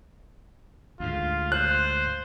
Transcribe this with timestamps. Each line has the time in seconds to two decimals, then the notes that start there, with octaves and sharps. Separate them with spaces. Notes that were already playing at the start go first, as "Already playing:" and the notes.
1.00 D2 G#2 F4
1.52 C5 F#6